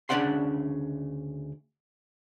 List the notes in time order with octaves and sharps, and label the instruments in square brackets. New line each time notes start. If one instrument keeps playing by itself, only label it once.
[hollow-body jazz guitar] D2 C#3 D4 D5 F#5 C6